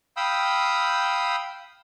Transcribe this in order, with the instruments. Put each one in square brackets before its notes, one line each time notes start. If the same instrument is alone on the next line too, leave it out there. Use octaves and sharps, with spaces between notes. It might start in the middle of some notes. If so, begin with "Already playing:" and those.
[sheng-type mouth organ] F5 G5 B5 D#6 E6 G6